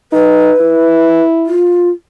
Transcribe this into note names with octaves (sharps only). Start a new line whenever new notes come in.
D#4 B4
E4
F4